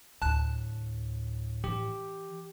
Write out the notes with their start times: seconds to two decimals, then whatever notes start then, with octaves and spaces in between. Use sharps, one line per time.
0.22 D2 A2 A5 F#6
1.64 E3 G4